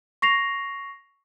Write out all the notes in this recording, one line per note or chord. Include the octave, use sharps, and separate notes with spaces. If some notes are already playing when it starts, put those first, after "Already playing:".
C#6 A#6 C7 F7